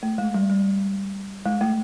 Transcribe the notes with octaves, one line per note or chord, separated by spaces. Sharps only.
A3
G#3
G3
G3
G#3
A3